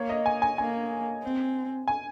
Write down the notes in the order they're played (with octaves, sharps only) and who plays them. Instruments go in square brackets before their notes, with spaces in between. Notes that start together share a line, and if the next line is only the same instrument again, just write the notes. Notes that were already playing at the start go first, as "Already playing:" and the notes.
Already playing: [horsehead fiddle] A#3 [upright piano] C#5
[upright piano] D#5
G#5
G#5
[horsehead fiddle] A#3 [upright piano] G#5
[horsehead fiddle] C4
[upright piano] G#5